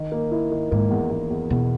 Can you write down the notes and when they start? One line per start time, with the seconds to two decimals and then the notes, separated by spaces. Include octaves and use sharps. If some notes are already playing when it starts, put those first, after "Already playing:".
Already playing: D#3
0.12 A#3
0.31 E4
0.51 D#3
0.71 G#2 A#3
0.91 E2
1.11 E2
1.30 E2
1.50 E2 B2